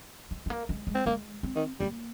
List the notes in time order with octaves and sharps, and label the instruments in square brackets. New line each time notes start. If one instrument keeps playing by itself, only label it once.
[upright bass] G#3
G#3
A#3
G#3
G#3
[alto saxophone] C4
[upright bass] G#3 [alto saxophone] A#3
[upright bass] C4
[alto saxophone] D#3
[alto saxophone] G3 [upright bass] A#3